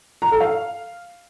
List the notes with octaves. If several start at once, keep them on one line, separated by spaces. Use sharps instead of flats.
A#5
A4
F5